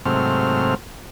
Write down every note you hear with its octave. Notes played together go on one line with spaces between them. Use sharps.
G#2 C3 F#3 A3 C4 F6